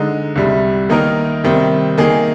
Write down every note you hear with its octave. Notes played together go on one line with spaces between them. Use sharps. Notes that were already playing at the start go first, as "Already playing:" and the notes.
Already playing: D3 G#3 D#4
C2 C3 G3
D#3 A#3 D#4 A#4
C3 D#3 G3 C4
D#3 A#3 D#4 G#4